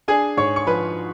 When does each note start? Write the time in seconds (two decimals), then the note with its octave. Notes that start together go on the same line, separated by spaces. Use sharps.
0.08 D4 G#4 G#5
0.37 G#2 C#5 C#6
0.56 C#6
0.67 F3 B4 B5